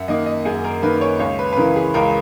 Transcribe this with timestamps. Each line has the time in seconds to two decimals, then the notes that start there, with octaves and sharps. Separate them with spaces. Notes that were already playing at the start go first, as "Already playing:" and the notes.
Already playing: F#2 E5 F#5
0.08 D#3 A#3 D#5
0.26 D#5
0.45 F#2 G#4
0.64 A#4
0.82 D#3 A#3 B4
1.01 C#5
1.19 C#2 C#5
1.39 B4
1.53 B4
1.56 C#3 E3 A#4
1.76 G#4
1.94 C#2 A#4